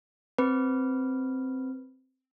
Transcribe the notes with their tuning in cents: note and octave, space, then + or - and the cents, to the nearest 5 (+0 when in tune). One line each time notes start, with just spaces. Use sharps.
C4 +0 B4 -5